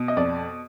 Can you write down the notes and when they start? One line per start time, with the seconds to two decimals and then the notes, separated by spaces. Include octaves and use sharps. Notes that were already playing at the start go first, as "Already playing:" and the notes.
Already playing: B2
0.08 D#5
0.17 F2 D5